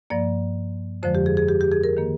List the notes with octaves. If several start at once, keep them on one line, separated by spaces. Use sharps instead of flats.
G2 F3 A#3 D5
F2 D3 F3 G#3 C5
G4
G#4
G#4
G4
G4
G#4
A#4
D#3 A#3